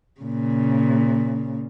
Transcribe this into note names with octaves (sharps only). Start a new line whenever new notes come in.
A#2 C#3